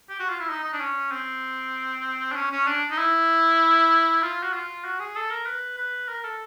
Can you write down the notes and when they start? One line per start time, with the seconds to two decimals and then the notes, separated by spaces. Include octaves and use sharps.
0.10 G4
0.20 F#4
0.30 F4
0.40 E4
0.50 D#4
0.64 D#4
0.73 D4
0.81 C#4
1.12 C4
2.32 D4
2.36 C#4
2.52 C#4
2.68 D4
2.91 D#4
2.98 E4
4.23 F4
4.43 F#4
4.53 F4
4.85 F#4
5.00 G#4
5.16 A4
5.31 A#4
5.47 B4
5.77 B4
6.09 A#4
6.25 A4